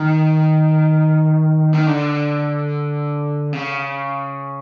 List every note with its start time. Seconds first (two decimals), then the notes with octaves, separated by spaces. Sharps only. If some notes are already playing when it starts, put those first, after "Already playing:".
Already playing: D#3
1.74 D#3
1.86 D3
3.53 C#3